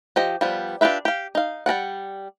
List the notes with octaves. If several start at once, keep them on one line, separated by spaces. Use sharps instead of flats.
F3 G4 D#5
F3 G3 B3
D4 F4 G4 B4 E5
G4 F5
D#4 F5
G3 A#4 D5 F#5